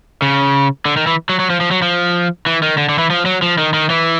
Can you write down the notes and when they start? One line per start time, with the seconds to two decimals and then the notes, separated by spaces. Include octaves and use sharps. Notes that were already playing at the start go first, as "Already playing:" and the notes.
0.22 C#3
0.86 D3
0.97 D#3
1.07 E3
1.29 F#3
1.40 F#3
1.50 F3
1.61 F3
1.71 F#3
1.82 F3
2.46 E3
2.63 D#3
2.78 D3
2.89 D3
2.99 E3
3.10 F3
3.26 F#3
3.42 F3
3.58 D#3
3.73 D#3
3.90 E3